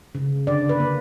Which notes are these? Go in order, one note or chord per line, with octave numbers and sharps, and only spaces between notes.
C#3
D3 D5
B4
A#3